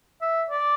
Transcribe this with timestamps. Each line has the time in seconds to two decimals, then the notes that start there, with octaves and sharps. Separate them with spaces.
0.21 E5
0.50 D5